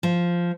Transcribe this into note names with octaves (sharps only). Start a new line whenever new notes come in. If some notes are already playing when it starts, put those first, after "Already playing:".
F3